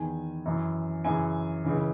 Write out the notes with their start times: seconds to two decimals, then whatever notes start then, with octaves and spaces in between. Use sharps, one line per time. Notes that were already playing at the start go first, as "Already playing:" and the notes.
Already playing: E2 D#3 G#5
0.45 F#2 E3
1.04 F#2 C#3 E3 G#5
1.64 C#2 C#3 E3